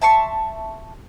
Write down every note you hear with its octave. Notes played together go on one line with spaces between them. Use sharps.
E5 A5 C6 C#6